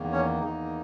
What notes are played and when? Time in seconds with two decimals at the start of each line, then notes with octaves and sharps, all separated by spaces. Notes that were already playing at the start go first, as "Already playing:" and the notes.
Already playing: E2 D#3 A#3
0.12 C#4 C#5
0.40 E2 D#3 A#3 D#4